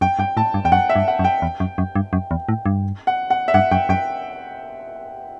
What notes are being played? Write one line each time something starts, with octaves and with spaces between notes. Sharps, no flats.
F#2 G5
G2 G5
A2 A5
G2
E2 G5
F#2 F#5
E5
G2
F#5
F#2
G5
E2
F#2
F#2
G2
F#2
E2
A2
G2
F#5
F#5
E5
G2 F#5
F#2 G5
F#2 G5